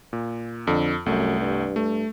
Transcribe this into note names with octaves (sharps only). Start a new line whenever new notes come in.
A#2
F2 D3
C2 F#2 A3
G2
A3